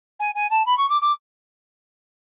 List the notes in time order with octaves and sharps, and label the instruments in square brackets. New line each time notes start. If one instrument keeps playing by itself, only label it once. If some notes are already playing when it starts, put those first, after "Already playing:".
[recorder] G#5
G#5
A5
B5
C#6
D6
D6